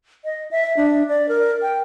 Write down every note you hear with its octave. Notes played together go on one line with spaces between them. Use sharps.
D#5
E5
D4
D5
A#4
G5